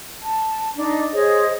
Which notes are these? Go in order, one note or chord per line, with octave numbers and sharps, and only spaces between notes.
A5
D4 D#4
G#4 C5 C#5 D#5